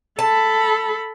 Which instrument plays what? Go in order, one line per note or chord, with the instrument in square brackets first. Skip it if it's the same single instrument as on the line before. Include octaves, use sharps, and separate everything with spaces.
[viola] A4 B5 [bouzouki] A5